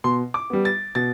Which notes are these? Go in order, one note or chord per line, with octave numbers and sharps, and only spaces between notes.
B2 C6
D6
G3 B3
A6
B2 A6